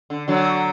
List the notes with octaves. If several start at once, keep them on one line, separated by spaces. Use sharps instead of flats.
D3
D3 F#3